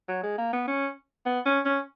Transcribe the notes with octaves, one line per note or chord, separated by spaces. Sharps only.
F#3
G#3
A#3
B3
C#4
B3
C#4
C#4